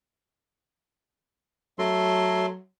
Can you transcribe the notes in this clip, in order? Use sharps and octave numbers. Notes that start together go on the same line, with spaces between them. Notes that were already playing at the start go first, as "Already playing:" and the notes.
F#3 A3 A4 C6